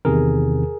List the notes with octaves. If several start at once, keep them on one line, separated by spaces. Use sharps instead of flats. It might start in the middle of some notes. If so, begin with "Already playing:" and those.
E2 C3 D#3 G#4 A#4